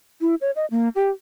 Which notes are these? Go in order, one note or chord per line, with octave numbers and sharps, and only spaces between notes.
E4
C#5
D#5
A#3
G4